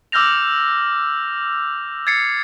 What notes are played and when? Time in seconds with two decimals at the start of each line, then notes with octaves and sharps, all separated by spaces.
0.12 D6 E6 F6 G6 A#6 F7
2.07 G#6 A6 C7 C#7